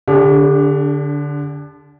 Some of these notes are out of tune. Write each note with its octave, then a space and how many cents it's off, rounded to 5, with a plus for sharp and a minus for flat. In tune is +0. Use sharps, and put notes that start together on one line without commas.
D3 -5 D4 -30 G4 +35